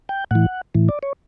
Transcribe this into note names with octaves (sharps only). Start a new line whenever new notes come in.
G5
A2 E3 F#5
A2 E3
D5
C#5